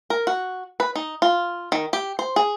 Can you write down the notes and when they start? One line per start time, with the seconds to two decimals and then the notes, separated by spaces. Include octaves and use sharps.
0.10 A#4
0.27 F#4
0.80 B4
0.95 D#4
1.22 F4
1.72 D#3
1.93 G4
2.19 C5
2.36 G#4